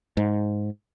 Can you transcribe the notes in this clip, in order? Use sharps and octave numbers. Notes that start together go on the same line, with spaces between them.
G#2